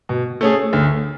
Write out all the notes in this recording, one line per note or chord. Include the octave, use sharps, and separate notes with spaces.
B2
A3 C#4 G#4
D2